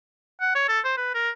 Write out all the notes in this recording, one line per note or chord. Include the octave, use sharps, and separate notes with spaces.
F#5
C#5
A4
C5
B4
A#4